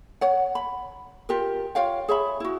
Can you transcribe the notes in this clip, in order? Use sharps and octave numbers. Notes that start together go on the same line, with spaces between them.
C#5 F#5
B5
F4 G4 A#4
F4 C#5 F5 G5
G#4 C#5 E5 B5
E4 F#4